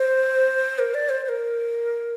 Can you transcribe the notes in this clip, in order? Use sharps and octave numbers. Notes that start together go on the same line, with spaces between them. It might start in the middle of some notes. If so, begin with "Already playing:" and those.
Already playing: C5
A#4
D5
C5
C5
A#4